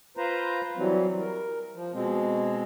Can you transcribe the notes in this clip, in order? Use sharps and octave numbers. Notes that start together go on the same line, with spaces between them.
F4 B4 C5 A#5
E3 F#3 G3 C4
A#4
F3
B2 G#3 C4